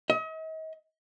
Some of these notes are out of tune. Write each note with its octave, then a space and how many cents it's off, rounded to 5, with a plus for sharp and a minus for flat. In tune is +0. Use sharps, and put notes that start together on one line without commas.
D#5 +40